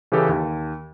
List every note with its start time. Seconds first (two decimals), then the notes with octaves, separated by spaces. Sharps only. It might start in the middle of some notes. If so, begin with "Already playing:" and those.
0.12 C#3 E3 C#4 G4 A4
0.29 D#2